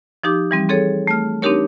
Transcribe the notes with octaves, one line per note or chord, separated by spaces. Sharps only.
F3 D#4 G4 D6
E3 G3 C4
C4 G#4 A4 C#5
A3 F6
C4 D4 D#4 G4 A#4 C#5